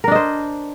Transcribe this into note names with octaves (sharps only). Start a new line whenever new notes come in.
D4 A#4 C5 D#5